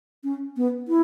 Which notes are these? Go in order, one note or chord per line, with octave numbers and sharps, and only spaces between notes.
C#4
B3
E4